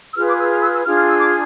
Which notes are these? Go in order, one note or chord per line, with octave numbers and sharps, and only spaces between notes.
E6
F4 G#4 B4 F6
D6
E6
F6
E6
E6
D4 F4 G#4 F6
F6
E6
D6